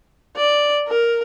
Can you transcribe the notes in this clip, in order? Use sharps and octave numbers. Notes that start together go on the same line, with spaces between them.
D5
A#4